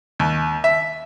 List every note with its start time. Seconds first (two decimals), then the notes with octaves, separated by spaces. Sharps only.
0.19 D#2
0.64 E5